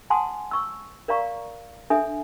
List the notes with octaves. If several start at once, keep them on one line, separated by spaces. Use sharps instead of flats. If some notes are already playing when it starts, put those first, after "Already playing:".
F#5 G#5 A5 C6 D#6
C#6 E6
A#4 D5 F5 A#5 C#6
D4 A4 E5 G#5 D#6